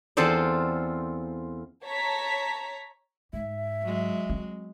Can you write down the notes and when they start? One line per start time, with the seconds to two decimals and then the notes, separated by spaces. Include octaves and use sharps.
0.17 E2 C4 F4 A4 C5 D5
1.83 C#5 A5 A#5 B6
3.33 G#2 E5
3.83 F#3 G#3
4.30 C4